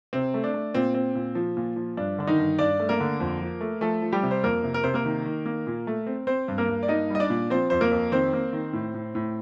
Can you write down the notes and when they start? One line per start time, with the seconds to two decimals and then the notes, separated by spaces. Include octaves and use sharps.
0.13 C3 C4
0.34 A3
0.44 D4
0.54 A3
0.74 A#2 C4
0.94 C4
1.15 A#2
1.35 F3
1.57 A#2
1.76 F3
1.97 G2 D4
2.18 D3 D4
2.27 D#3 D#4
2.38 G2
2.58 G2 D4 D5
2.80 A3
2.89 A#3 A#4
3.00 D3
3.20 F2
3.41 F3
3.61 A3
3.81 F3 A3 A4
4.02 F3
4.12 G3 G4
4.23 C3
4.31 C5
4.44 F2 A#3 A#4
4.63 C3
4.74 A#4
4.84 C3 C5
4.94 A#3 A#4
5.05 D#3
5.25 D#3
5.46 A#3
5.67 A#2
5.87 A3
6.07 C4
6.27 C4 C5
6.48 G2
6.58 A#3 A#4
6.68 G2
6.83 D5
6.88 A#3 D#4 D#5
7.10 G3 D#5
7.20 D4 D5
7.30 A#2
7.50 F3 C4 C5
7.70 F2 C5
7.81 A#3 A#4
7.92 F2
8.12 D#3 C4 C5
8.33 A#3
8.53 D#3
8.73 A2
8.94 A2
9.15 A2